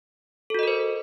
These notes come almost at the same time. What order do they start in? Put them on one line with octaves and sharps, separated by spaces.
A4 F#4 D#5 A#4 C5